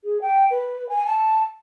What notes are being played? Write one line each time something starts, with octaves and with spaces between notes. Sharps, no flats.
G#4
G5
B4
G#5
A5